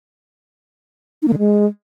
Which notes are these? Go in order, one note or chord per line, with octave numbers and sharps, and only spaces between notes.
D#4
A#3
D3
G#3